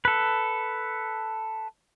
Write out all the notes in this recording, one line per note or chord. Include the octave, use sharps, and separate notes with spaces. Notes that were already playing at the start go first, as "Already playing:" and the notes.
A4 B4